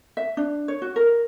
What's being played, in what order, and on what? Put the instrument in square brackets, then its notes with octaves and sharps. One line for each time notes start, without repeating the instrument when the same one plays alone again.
[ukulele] E5
D4
C#5
F#4
A#4